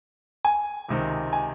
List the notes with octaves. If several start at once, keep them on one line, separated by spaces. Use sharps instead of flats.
G#5
C#2 C3 D#3
G#5